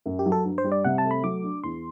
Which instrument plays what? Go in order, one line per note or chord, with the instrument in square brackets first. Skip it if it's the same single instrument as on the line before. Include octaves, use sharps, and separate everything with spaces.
[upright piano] F#2
[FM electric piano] G4
[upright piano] F#3
[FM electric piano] A4
[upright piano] G2
[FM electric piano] C5
[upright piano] G3
[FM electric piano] D5
[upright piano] C3 [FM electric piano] F#5
[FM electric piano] A5
[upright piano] A3
[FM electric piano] B5
[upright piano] F#3 [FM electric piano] D6
[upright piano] D4
[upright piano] E2 [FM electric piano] C6